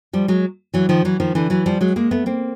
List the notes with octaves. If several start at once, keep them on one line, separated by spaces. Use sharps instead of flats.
F3 G3
F#3 G#3
E3 F#3
D#3 F3
E3 F#3
D#3 F3
D3 E3
E3 F#3
F3 G3
F#3 G#3
G#3 A#3
A3 B3
A#3 C4